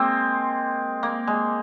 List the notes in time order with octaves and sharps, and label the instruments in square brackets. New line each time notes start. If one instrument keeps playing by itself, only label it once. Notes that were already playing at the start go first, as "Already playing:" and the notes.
Already playing: [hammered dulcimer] G#3 A#3 C4
A#3
G#3